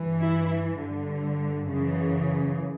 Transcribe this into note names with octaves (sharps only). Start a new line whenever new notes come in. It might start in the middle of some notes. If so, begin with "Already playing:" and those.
Already playing: G2 E3
E4
G2 D3
F#2 C#3 E3